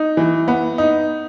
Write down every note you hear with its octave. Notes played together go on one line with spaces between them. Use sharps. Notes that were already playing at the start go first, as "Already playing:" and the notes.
Already playing: D#4
E3
B3
D#4